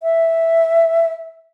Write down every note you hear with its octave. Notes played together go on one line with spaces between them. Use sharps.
E5